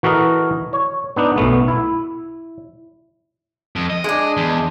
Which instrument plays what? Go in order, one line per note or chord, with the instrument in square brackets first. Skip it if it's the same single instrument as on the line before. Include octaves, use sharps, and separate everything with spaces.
[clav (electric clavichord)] E3 F#4 A4 A#4 D#5
C#5
B3 D4 D#4
B1 F#2 A3 B3
E4
[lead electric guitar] F2
D#5
[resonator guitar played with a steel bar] G#3 D4
[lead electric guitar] E2